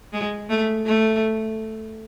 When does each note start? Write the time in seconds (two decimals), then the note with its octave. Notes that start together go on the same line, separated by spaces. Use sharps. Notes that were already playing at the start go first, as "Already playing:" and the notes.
0.13 G#3
0.49 A3
0.86 A3